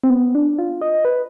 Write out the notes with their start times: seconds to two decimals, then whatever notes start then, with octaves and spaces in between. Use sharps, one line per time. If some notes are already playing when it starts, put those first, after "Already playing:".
0.04 C4
0.10 B3
0.35 D4
0.58 F4
0.81 D#5
1.05 B4